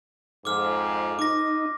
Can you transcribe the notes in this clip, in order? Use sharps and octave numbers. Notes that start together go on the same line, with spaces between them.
F2 G#2 D6 F6
D#4 D6 A#6